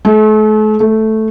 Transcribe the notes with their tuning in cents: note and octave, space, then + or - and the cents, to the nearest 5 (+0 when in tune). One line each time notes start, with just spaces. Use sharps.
A3 -40
A3 -5